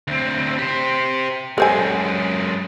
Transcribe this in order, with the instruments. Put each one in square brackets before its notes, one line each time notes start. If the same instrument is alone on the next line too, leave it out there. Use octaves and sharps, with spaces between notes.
[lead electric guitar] D2 C4
G4 C5
[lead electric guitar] F#2 G#3 [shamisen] A4 C5 G#5